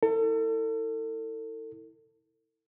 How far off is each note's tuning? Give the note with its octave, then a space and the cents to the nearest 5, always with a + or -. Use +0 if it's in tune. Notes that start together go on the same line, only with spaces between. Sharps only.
E4 -25 A4 +35